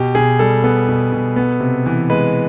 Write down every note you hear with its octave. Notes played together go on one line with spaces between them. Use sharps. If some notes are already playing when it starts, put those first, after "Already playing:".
Already playing: B2 G4
B2 G#4
G3 A4
B3 A4
B2
B2
B3
C3
E3
G#3 B4